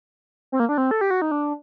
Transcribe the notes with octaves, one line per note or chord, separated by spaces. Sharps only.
C4
A#3
D4
C4
A4
G4
F#4
D#4
D4